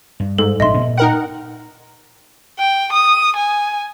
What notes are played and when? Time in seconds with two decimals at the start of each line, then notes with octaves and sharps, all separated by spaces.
0.20 G2
0.38 G#2 A4
0.60 A#1 D4 D#5 E5 C6
0.78 G2 A#2
0.98 D#4 A#4 F#5 G5
2.59 G5
2.93 D#6
3.36 G#5